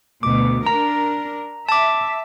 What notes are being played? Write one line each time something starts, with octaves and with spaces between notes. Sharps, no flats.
D2 B2 D6
D4 A#4 A#5
E5 A5 D6